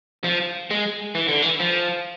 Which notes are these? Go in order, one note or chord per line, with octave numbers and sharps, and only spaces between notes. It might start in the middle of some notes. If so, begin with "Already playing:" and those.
F3
G#3
E3
D3
E3
F3